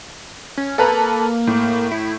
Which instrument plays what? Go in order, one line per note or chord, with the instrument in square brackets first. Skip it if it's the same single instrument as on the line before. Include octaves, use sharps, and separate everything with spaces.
[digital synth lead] C#4
[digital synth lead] A#3 [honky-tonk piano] A4 B4 A#5
[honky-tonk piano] A2
[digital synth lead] E4